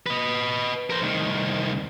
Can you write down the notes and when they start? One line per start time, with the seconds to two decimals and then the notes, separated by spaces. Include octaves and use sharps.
0.07 B4 D#5
0.90 A#4 C5
1.02 C2 D#3